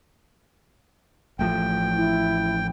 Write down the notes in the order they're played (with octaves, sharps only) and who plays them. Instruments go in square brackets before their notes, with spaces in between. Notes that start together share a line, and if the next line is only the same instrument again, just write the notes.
[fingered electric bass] A1 A2 F3 [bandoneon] G5
[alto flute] E4